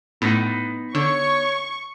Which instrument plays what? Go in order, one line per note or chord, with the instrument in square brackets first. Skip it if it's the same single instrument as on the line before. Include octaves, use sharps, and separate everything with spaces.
[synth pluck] A2 [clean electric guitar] B3 D#4 F#5
[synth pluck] D3 [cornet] C#5 [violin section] C#6